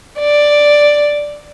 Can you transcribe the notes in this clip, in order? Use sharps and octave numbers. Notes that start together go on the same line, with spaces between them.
D5